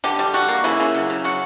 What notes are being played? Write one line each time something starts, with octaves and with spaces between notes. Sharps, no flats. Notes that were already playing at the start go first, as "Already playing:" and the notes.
D3 G4
G3
G3 F#4
A#3
C#3 E4
C#3
F#3
C#3
F#3 F#4